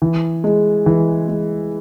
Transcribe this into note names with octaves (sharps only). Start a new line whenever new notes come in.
E3
G#3
E3
G#3